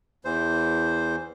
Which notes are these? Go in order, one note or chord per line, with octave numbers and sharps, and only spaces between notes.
E2 E3 C5